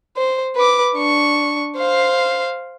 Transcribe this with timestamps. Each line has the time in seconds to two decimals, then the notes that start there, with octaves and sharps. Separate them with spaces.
0.17 C5
0.56 B4 D6
0.96 D4 C#6
1.77 C5 F5